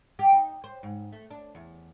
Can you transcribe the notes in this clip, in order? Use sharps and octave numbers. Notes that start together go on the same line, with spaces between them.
G4
D#4
C5
G#2
A3
D4
E2